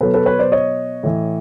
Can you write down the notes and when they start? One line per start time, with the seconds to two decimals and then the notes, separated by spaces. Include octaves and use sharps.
0.01 B2 F#3 A4 B4
0.14 A4 B4
0.26 B4 C#5
0.39 C5 D5
0.52 C#5 D#5
1.03 A2 E3